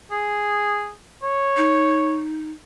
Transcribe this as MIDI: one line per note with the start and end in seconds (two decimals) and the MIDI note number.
0.11 0.91 68
1.22 2.19 73
1.57 2.50 63